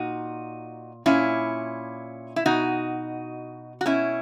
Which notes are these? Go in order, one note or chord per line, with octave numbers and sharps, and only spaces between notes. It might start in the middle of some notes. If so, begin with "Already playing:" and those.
Already playing: A#2 D#4 F#4
A#2 C#4 E4
E4
B2 D#4 F#4
F#4
B2 C#4 E4